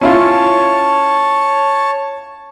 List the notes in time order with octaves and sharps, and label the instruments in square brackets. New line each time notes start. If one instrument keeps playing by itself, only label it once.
[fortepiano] C#4 E4 F4 [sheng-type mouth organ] C#5 A5